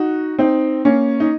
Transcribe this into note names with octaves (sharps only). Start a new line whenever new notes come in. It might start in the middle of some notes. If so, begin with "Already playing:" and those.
Already playing: D#4 F#4
C4 D#4
A#3 C#4
D#4